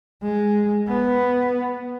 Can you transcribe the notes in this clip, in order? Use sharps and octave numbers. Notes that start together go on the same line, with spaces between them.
G#3
B3